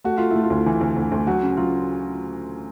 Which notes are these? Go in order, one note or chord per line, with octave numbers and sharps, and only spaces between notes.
A3 F#4
A3 F4
E4
A3
F4
D2
E3
D2
D2
D2
F#3 F#4
C#3
F#3 F4